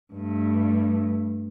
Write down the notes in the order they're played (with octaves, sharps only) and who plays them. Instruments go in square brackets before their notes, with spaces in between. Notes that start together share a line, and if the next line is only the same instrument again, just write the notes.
[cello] G2 A3